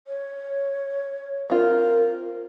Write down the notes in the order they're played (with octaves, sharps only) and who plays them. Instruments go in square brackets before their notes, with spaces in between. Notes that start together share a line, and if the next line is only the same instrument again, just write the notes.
[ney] C#5
[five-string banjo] C4 F4 [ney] A#4